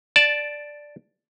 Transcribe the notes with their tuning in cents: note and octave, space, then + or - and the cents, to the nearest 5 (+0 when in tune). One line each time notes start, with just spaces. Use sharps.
D5 +0 A5 -10